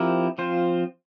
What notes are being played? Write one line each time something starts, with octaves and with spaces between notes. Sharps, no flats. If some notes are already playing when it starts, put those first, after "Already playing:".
Already playing: F3 C4 E4 G4 A#4
F3 C4 F4 C5